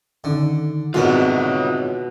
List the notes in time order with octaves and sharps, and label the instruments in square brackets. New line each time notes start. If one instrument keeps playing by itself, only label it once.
[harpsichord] D3 [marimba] D#3 C#4 D#4
[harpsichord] C2 G#2 A#4 [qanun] B2 [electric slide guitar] F4 C#5